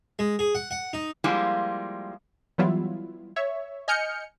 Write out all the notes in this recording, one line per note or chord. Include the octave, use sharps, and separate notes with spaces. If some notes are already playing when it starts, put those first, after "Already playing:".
G#3
G#4
F#5
F#5
D#4
F3 G3 G#3 A#3 E4 F4
E3 F#3 G3 B3 E4 F4
C#5 E5
D#5 G#5 F6 G6 C#7